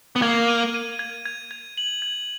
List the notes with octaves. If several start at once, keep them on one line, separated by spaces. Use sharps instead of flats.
B3
A#3 G#6
D#7
D#7
G#6
G#6
G#6
F#7
G#6